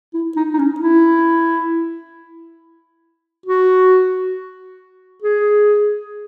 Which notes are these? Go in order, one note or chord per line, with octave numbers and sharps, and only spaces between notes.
E4
D#4
D#4
C#4
E4
F#4
G#4